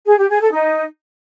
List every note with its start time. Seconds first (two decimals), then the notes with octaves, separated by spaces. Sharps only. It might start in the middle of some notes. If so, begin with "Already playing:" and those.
0.06 G#4
0.18 G4
0.29 G#4
0.41 A4
0.53 D#4